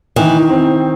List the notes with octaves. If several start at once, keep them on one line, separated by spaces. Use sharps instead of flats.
D#3 E3
C4